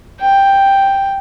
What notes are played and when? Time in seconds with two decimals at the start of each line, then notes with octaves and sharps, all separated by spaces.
0.20 G5